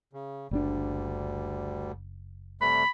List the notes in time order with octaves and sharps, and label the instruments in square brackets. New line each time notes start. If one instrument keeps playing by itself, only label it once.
[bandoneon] C#3
[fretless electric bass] F#1 A#2 D4 [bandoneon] D2 G3
[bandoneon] C3 G3 A3 [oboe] B5